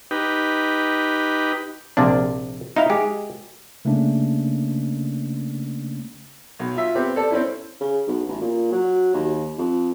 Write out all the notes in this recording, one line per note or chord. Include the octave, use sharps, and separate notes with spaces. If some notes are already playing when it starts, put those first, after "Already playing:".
D#4 G4 B4
A#1 C3 A#3 D4
D#4 E4 F5
G#3 G4 G#4
C#3 A3 A#3 C#4 D4
B1
F4 E5
B3 C4 G4
A4 D5
C4 C#4 E4
C#3
B1
A1
A#2
F#3
D#2
F2